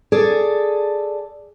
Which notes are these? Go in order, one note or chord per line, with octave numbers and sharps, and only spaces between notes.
G#4 A4 D5